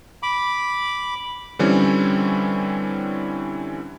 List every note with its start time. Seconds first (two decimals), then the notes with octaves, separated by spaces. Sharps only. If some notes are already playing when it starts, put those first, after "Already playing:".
0.23 B5 D6
1.59 D3 E3 G3 C4 C#4 E4